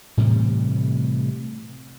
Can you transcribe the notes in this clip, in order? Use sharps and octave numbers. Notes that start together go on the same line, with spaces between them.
A2 C3 E3 G3